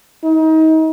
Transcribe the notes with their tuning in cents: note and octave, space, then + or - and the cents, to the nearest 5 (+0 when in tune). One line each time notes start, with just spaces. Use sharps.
D#4 +30